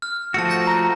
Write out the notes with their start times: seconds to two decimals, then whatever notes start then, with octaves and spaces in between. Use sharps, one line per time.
0.02 F6
0.34 F3 A3 F#4 A5 E6 C#7
0.49 E6 G6 A#6
0.67 A#5